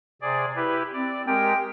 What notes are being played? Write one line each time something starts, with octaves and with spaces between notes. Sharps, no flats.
C3 G#4 D5
E4 G4 B4
C4 D5
G#3 G4 A#4 G5